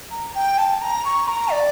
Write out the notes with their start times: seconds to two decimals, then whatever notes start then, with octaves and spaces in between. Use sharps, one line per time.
0.11 A#5
0.35 G5
0.58 A5
0.81 A#5
1.05 C#6
1.28 A#5
1.52 D5